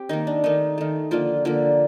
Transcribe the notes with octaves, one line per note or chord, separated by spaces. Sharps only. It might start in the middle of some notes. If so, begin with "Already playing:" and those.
Already playing: C4 G4
D#3 A#3 D#4
D4
D#3 A3 D#4
D#3 A3
D3 F3 A#3 F4
D3 F3 A#3